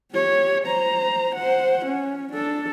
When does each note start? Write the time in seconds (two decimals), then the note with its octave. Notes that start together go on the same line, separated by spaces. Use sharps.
0.12 G4 C#5
0.64 C5 A#5
1.35 C5 F#5
1.85 C#4
2.33 D4 A4